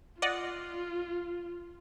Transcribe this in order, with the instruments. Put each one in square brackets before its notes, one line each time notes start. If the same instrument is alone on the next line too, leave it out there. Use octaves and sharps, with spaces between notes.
[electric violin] F4 [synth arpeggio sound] D5 D#5 F#5